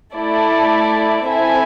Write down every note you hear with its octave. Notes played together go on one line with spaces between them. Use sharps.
A3 E4 A4 D5
C4 E4 A4 E5 G#5